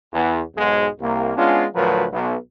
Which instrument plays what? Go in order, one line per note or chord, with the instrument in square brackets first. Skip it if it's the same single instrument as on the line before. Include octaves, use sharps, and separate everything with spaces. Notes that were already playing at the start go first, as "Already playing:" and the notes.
[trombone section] E2
B1 G#2 G#3
C2 A#3
G#3 B3 C#4 D4 F4
D2 A2 F3 F#3 A#4 B4
B1